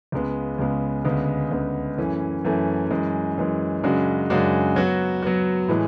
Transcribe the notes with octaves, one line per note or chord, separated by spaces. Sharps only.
C#2 C#3 G#3 B3
C#2 C#3 G#3 B3
D2 C#3 G#3 B3
D2 C#3 G#3 B3
F#2 E3 A3 C#4
F#2 E3 A3 C#4
F#2 E3 G#3
F#2 E3 G#3
F#2 C#3 G#3 D4 F#4
F#2 C#3 G#3 D4 F#4
F#3 B3 F#4
F#3 B3 F#4
A2 E3 G#3